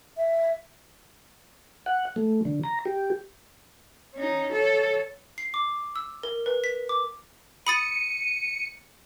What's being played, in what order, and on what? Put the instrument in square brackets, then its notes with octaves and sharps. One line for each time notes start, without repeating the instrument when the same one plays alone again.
[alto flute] E5
[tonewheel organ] F#5
A3
D3
A#5
G4
[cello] C#4 D#4
A4 C#5
[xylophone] C7
D6
E6
A#4
B4
B6
D6
[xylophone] B5 D#6 A6 [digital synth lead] C#7 [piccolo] D#7